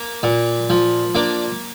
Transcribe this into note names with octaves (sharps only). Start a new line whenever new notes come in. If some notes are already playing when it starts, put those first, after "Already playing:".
Already playing: A#3
A#2
F3
A#3 D4